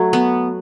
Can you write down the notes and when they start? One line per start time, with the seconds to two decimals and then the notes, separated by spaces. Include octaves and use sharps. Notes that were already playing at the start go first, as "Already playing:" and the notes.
Already playing: F#3 A3 A4
0.13 B3